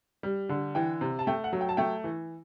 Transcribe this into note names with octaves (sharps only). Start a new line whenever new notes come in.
G3
D3
E3 G5
C3
A5
A3 G5
F#5
F#3
G5
A5
A3 G5
E3